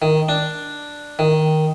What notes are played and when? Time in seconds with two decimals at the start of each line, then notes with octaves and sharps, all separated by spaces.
0.02 D#3
0.29 D4
1.19 D#3